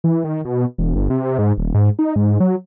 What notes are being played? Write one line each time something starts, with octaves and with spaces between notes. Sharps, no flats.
E3
D#3
B2
E1
G1
C3
G#2
D#1
G#2
D#4
G#2
F#3